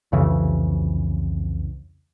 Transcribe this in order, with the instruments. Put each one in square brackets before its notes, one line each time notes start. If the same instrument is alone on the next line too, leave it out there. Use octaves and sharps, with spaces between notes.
[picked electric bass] C2 F2 C#3 E3